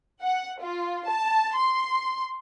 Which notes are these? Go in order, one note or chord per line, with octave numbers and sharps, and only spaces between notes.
F#5
F4
A5
C6